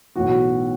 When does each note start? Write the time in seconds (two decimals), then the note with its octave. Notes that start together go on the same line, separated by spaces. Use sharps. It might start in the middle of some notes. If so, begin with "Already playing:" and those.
0.15 B1 A2 E3 F#4